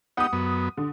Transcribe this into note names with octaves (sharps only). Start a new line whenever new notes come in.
B3 D#4 G4 F#5 D#6
F#2 B3
D3